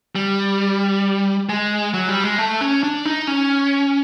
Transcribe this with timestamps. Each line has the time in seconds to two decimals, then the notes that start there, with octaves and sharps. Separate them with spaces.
0.15 G3
1.49 G#3
1.94 F#3
2.09 G3
2.24 G#3
2.38 A3
2.61 C#4
2.83 D4
3.05 D#4
3.27 C#4